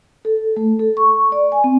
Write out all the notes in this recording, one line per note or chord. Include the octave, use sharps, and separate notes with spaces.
A4
A3
A4
C#6
D5
G#5
C4